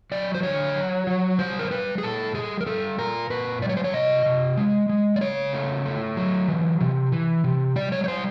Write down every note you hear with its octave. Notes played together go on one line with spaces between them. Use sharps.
F#3 D5
C5
D3 C#5
F#3
F#3
G3 C5
A#4
G3 B4
G#4
A#2 A4
G3 G#4
A#4
G3 A4
A#2 A#4
A#2 B4
G3 D5
C#5
C5
C#5
C3 D#5
C3
G#3
G#3
D5
C#3 C#5
A3
A3
F#3
E3
C3
E3
C3
G3 D5
C#5
C#5
G3 C5